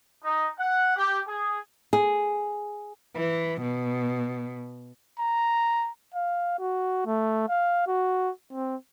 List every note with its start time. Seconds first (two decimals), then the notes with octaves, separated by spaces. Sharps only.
0.24 D#4
0.59 F#5
0.97 G4
1.28 G#4
1.93 G#4
3.15 E3
3.63 B2
5.19 A#5
6.14 F5
6.59 F#4
7.06 A3
7.49 F5
7.87 F#4
8.52 C4